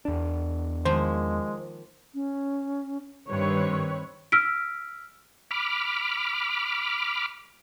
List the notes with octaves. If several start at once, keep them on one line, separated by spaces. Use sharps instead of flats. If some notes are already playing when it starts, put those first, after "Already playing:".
E2 D4
D#3 F3 G#3 A#3 C5
C#4
G2 D#3 C4 B4 C#5
E6 F6 B6 D7
B5 D6 F6